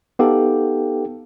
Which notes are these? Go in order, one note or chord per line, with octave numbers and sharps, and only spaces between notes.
B3 D#4 G4 A4 F5 G5